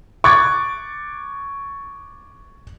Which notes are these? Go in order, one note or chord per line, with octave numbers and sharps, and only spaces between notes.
C#6 D6 F#6 G#6 A6